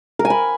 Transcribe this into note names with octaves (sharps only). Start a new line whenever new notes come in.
A#4
G#5
B5